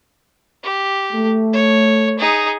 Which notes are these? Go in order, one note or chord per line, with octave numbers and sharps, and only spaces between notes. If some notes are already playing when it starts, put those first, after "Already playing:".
G4
A3
C#5
D#4 G#4